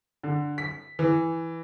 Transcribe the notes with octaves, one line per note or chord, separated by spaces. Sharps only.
D3
B6
E3